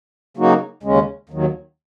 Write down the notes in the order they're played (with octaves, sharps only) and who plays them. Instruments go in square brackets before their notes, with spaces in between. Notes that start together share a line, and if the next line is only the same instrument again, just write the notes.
[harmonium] C#3 F#3 A#3 D#4 F#4
D#2 C#3 G#3 C#4
D#2 D#3 F#3